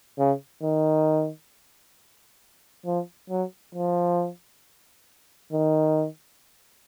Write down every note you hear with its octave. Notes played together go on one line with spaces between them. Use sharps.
C#3
D#3
F3
F#3
F3
D#3